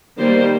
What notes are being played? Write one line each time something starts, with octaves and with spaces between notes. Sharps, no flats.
D#3 G3 A#3 G4 C5